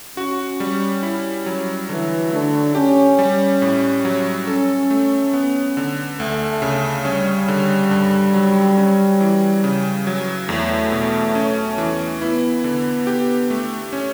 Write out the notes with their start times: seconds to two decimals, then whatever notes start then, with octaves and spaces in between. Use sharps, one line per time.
0.17 C#4 F#4
0.60 G3
1.03 E4
1.46 F#3
1.89 D3 E3
2.32 D3 A3
2.75 C#4 G4
3.19 G3
3.62 A2
4.05 F#3
4.47 C#4 A4
4.90 A3
5.33 B3
5.77 D3
6.19 D2 A3
6.62 C#3
7.05 G3 C#4
7.48 D3
7.91 G2
8.34 F#3
8.78 C#4
9.20 E3
9.64 C#3
10.07 F#3
10.49 E2 A3
10.92 B2
11.35 C#4
11.78 E3
12.21 B3 E4
12.64 D3
13.07 G4
13.50 A3
13.93 C#4